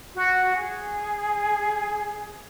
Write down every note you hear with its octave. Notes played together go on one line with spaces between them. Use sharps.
F#4
G#4